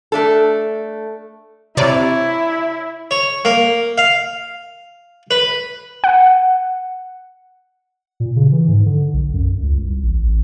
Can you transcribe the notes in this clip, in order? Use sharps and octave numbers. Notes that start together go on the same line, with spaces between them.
A3 D4 A4
C3 D4 E4 C#5 D5 A#5
C#5
A#3
F5
B4
F#5
A#2
C#3
E3
G#2
D3
B1
F#2
C#2
C2
A1
A1